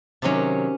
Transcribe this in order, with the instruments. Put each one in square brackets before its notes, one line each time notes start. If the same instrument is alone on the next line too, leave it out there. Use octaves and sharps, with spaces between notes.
[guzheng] C3 D#3 F#3 C#4